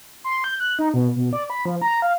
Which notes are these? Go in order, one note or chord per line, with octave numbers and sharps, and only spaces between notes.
C6
G6
F#6
D#4
B2
B2
D5
B5
F3
A#5
F5